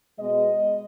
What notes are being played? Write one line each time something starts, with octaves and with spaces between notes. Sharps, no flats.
B2 G#3 B3 D#5